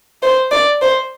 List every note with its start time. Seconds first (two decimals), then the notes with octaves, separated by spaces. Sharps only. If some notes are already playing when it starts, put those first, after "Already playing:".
0.22 C5
0.51 D5
0.82 C5